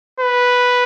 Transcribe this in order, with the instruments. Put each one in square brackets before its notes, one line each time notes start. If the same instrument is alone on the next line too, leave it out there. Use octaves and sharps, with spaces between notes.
[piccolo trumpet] B4